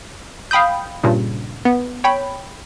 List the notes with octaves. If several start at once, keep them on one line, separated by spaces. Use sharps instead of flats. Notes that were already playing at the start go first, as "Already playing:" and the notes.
F5 G5 B5 D#6 G6
G2 A#2 C#3
B3
C#5 G5 B5